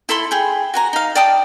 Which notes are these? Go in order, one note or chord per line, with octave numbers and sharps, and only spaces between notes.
E4 A4 B5 C6
G#4 G5
F#4 G#5 A#5
D#4 F5
D5 G5 A5 D#6